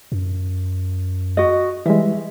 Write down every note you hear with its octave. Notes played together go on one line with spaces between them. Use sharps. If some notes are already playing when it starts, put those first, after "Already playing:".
F#2
F#4 D#5
E3 G3 G#3 E5